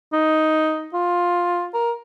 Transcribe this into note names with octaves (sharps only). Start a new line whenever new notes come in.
D#4
F4
A#4